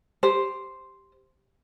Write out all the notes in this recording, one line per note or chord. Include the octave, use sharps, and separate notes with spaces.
G4 C5